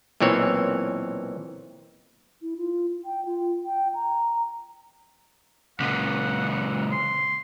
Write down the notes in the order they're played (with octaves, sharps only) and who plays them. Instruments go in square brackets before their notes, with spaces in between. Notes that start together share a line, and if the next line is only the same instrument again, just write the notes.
[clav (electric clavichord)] B1 A#2 E3 C4 C#5
[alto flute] E4
F4
G5
F4
G5
A#5
[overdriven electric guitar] C#2 A#2 [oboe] F#5
[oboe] C6